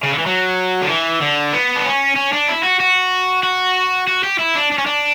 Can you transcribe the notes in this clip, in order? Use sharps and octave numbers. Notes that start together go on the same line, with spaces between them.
C#3
D3
E3
F#3
D3
E3
D3
B3
D4
C#4
C#4
D4
E4
F#4
F#4
F#4
F#4
G4
E4
D4
D4
C#4
D4